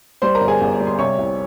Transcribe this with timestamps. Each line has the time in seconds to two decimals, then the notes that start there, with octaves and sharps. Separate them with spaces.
0.22 G3 C5 C6
0.35 A#4 A#5
0.41 G1
0.48 G#4 G#5
0.61 G1
0.80 G3
0.87 C6
0.99 C3 C#5 C#6
1.18 C2